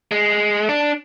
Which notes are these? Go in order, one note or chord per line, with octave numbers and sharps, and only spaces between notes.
G#3
D4